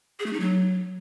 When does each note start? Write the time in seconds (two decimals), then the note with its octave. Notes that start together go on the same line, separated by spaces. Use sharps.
0.19 G#4
0.26 A3
0.33 D#4
0.40 F#3